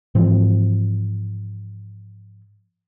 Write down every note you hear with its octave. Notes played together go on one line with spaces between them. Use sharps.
G#2 E3 F3 C4